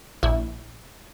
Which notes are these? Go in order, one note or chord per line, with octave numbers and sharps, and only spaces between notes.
A#1 E4